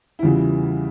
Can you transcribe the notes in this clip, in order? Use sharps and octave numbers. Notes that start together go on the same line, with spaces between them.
E4
E2 C#3 E3 G3 F4